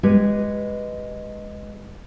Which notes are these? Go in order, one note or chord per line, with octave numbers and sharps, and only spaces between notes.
G#3 G4 B4 C#5